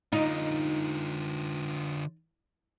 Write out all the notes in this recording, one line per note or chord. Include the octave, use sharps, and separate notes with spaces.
D3 D#4 F4